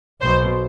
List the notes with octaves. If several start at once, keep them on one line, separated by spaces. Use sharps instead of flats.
B1 B2 C5